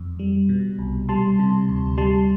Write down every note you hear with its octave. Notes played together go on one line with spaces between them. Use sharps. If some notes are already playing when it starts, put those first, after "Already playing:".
Already playing: F2
G3
B2
C2
G3 A5 C6
C3
D2
G3 A5 C6